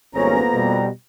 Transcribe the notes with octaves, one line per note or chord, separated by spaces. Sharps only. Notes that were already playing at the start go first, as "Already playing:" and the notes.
G#1 F2 G3 A#3 B3 C#4 A#5
B2 G3